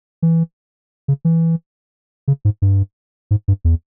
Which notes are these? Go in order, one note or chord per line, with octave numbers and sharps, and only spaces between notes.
E3
C#3
E3
C#3
G#2
G2
G#2
G2
E2